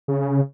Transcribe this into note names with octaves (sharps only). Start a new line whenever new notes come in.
C#3